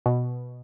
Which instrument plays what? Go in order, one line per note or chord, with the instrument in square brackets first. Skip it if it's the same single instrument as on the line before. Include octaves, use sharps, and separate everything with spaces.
[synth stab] B2